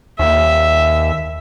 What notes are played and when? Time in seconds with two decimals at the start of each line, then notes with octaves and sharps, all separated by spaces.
0.19 D#2 E5